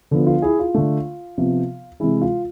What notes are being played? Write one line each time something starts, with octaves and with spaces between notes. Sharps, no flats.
D3 F3 B3
F4
E4 G#4
F4
D3 A3
C3 F3 B3
C3 E3 G#3 E4
F4